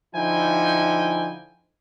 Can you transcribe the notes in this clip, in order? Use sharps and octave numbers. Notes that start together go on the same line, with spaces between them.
D3 F3 D#4 E4 G5 G#5